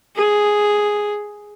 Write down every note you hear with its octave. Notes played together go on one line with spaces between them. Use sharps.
G#4